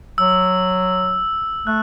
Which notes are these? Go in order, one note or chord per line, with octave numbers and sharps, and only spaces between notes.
F#3 E6
A3 F#6